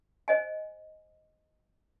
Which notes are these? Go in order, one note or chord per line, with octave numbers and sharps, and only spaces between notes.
C5 D#5 G#5